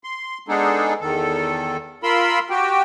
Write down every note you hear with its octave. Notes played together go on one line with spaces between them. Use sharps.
C6
G#3 B3 D4 D#4 G#4 A4
E2 D#3 A4
F4 A#4 B5 C6 E6
F#4 G4 G5